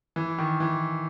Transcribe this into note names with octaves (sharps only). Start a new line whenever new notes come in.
E3
D#3
E3